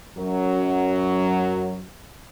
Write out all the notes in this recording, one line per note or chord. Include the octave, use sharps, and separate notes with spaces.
F#2 F#3